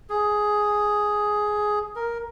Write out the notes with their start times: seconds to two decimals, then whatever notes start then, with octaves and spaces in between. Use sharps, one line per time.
0.10 G#4
1.96 A#4